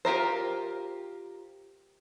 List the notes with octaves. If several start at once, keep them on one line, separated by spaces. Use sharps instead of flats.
F4 G4 A#4 C5